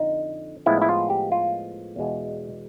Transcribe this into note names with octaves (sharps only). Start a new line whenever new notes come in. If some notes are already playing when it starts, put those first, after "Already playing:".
Already playing: F2 D3 D#4
A2 F3 G#3 B3 E4
E4
F4
G4
F4
E2 B2 G#3